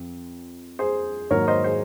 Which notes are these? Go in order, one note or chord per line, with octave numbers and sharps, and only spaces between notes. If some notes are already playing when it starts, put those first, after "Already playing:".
Already playing: F2 F3 C4
G#4 C5
G#2 D#3 F#3 A#3 A#4 C#5
C5 D#5
G#4 C5